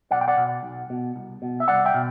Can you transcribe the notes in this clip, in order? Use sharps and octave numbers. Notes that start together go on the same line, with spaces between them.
B1 D5 F#5
G5
D5 F#5
B2
B1
B2
C2
B2
E5
C2 D5 F#5
E5 G5
B2